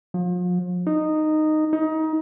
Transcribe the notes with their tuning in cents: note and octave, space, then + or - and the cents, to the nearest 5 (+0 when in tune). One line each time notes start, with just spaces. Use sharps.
F3 +40
D#4 -10
D#4 +25